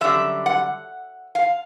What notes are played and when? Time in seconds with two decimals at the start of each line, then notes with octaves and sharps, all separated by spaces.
0.01 F#2 D3 G3 E5
0.46 F#5
1.35 F5